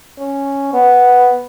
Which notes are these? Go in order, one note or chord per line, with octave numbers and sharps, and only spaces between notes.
C#4
B3